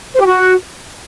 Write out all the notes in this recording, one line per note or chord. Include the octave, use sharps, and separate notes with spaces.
C5
G4
F#4